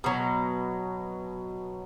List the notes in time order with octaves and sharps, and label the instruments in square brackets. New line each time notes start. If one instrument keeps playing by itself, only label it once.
[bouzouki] B2 F#3